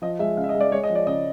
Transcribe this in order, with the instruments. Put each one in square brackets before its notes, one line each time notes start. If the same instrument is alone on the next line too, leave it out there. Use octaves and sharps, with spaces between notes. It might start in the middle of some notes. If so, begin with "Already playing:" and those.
[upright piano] F3 [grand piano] D#5
[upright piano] G#3 [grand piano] E5
[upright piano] C#3 [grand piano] F5
[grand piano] E5
D#5
[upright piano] G#3
[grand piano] D5
[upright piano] G#3 [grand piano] C#5
[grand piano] D#5
[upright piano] F3
[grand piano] D5
[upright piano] C#3 [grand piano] D#5